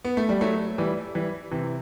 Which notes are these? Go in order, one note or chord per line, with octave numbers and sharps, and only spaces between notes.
B3
A3
G3
F#3 A3
E3 G3
E3 G3
C3 E3